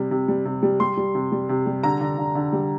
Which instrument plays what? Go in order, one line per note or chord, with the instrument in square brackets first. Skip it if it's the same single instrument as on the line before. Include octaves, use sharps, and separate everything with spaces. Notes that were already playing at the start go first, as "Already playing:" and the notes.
Already playing: [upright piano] C3 G3
C3
G3
C3
G3
G3 C6
G3
C3
G3
C3
G3
D3 A#5
D3
D3
D3
G3